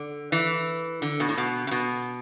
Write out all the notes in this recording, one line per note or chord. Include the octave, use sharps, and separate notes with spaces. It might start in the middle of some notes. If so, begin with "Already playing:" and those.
Already playing: D3
E3
D3
B2
A2
B2
C#3
B2